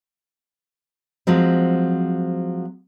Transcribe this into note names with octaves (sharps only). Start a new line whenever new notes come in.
F3 F#3 G#3 C4